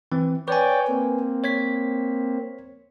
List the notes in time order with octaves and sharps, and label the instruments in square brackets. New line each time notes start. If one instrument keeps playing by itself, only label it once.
[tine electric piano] E3 C4
[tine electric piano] B4 G#5 [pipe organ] C#5 D5 G5
[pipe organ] A#3 C4
[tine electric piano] C#5 G#6 B6